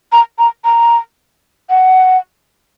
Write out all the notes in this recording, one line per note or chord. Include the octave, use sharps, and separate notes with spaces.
A#5
A#5
A#5
F#5